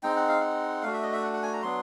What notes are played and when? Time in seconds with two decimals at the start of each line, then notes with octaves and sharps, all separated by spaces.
0.03 G#3 C4 D#4 G5
0.16 F#5
0.28 F5
0.41 F#5
0.83 A3 D4 F#4 F5
0.93 E5
1.03 D#5
1.13 E5
1.23 F#5
1.33 F#5
1.43 G#5
1.53 A#5
1.63 F#3 B3 D4 C6